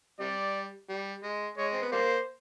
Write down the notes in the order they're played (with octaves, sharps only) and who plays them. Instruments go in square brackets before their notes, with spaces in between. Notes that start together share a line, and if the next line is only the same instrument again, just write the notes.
[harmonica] C3 G3 [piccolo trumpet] D5
[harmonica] G3
G#3
[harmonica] G#3 [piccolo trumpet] C#5
[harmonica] C4
B3
[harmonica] G3 A#3 [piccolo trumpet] C5